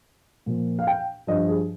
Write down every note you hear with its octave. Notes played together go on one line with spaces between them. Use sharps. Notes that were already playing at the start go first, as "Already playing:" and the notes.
A#2 F3
F5
G5
G2 F3 D#5
G#4